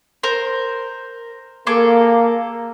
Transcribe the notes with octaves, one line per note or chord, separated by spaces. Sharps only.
A#4 C5
A#3 G#4 A4 D6